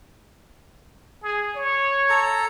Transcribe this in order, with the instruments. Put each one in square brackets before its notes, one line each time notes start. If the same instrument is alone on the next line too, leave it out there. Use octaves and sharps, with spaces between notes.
[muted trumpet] G#4
C#5
[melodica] A4 A#5